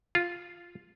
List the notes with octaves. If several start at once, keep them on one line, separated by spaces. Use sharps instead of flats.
F4